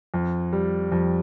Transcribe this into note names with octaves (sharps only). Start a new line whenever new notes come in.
F2
G3
F2